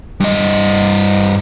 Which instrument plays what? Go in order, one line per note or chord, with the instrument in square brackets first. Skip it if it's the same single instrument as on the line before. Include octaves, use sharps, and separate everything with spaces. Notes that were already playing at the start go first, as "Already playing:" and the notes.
[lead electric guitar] G2 D#5